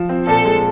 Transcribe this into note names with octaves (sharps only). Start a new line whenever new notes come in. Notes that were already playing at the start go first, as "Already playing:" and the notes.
Already playing: F3
C4
A#2 A4
G#3